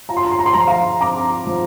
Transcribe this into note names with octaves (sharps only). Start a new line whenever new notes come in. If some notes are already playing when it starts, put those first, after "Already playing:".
F4 A#5
C6
A#5
C6
A#5
C6
F3 A#5
C6
F5 A#5
C4 A#5 D6
F3